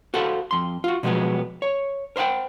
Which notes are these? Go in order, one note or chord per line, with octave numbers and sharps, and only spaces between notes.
F#4 A4 C5 F5 F#5
F2 C6
F4 F#4
B2 F3 F#3 G#3 B3
C#5
A#4 C5 E5 F#5 G5